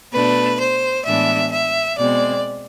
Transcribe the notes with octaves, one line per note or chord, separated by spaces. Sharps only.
B2 A3 D4 B4
C5
A2 E3 G#3 B3 D4 E5
E5
B2 G#3 C4 D5